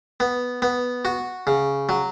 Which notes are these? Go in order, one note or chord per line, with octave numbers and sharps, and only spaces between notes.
B3
B3
F#4
C#3
F#3